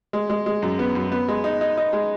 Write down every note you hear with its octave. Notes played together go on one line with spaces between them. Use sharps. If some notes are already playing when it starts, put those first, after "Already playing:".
G#3
G#3
G#3
F#2
B3
F#2
B3
G#3
D#4
D#4
D#4
G#3